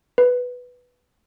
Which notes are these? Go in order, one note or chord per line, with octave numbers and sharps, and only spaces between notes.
B4